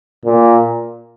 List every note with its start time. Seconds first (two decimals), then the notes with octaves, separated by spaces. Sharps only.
0.25 A#2